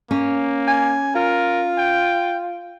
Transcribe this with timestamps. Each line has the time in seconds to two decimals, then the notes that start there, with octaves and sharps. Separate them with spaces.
0.11 A#3 C#4
0.68 G#5
1.15 F4 A#4
1.78 G5